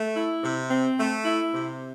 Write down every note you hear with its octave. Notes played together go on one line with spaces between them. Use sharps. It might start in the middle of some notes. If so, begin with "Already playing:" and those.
Already playing: A3
E4
C3
C4
A3
E4
C3